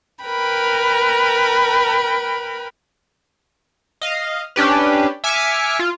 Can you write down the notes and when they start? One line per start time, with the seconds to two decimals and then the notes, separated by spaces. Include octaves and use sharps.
0.24 A#4 B4 G5 B5
4.02 D#5 F5
4.56 C#4 D4 G4 B4
5.24 E5 G#5 D6 F6 B6 C#7
5.79 F4